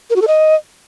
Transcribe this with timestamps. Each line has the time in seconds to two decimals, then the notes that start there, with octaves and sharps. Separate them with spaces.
0.10 A#4
0.16 F#4
0.22 A4
0.27 D#5